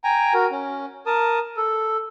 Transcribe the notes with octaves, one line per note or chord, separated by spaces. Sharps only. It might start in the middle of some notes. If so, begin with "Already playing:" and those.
G5 G#5 A#5
F#4 A#4
C#4
A#4 A5 D#6
A4